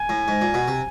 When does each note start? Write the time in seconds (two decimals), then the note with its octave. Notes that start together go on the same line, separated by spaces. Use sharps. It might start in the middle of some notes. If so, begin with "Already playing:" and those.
Already playing: G#5
0.09 A2
0.28 G#2
0.42 A#2
0.54 B2
0.68 C3